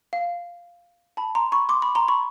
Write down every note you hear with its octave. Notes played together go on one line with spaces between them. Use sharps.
F5
A5 B5
A#5 C6
B5 C#6
C6 D6
B5 C#6
A#5 C6
B5 C#6